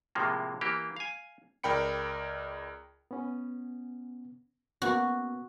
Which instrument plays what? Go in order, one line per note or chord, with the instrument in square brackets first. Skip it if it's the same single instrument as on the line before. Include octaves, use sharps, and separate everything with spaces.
[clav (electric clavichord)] A2 C3 F3 G#3 A#3
E3 A#3 G4
F5 G#5
[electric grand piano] C#2 A#4 D5 G5 B5 C#7
[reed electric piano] B3 C#4
[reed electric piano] A#3 B3 C#4 [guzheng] F#4